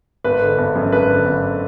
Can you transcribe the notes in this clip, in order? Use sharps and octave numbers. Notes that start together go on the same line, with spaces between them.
G#1 B4
D3
G#1
F#2
G#1 B4
D3
G#1